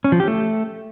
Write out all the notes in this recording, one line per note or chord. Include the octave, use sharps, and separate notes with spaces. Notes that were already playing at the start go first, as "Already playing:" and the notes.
C#4
F3
G4
A3